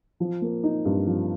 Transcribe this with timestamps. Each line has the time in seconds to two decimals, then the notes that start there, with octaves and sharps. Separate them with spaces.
0.20 F3
0.42 A#3
0.64 D#4
0.85 G2
1.07 F3